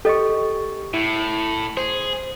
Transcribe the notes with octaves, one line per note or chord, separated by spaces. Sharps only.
G4 A4 D#5 C#6
A2 E4
G#4 C5